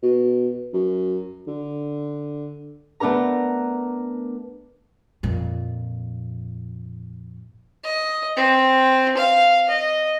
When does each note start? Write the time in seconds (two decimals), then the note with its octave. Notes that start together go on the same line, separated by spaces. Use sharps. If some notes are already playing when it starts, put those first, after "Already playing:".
0.02 B2
0.73 F#2
1.47 D3
3.00 A3 B3 D4 A#4 A#5
5.23 F2 A#2
7.84 D#5
8.37 C4
9.17 F5
9.69 D#5